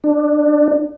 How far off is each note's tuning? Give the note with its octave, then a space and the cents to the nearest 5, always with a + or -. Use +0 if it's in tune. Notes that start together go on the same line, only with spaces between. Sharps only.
D4 +15